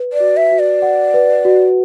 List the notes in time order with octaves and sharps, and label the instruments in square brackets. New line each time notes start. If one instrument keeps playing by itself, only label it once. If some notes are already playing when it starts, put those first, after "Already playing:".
Already playing: [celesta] B4
[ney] D5
[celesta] F#4
[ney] E5
[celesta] F#4
[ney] D5
[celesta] F#5
B4
F#4